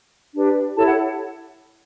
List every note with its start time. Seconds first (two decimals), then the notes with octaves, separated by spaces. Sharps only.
0.34 D4 G4 B4
0.77 E4 G4 A4 C#5 A5
0.87 F#5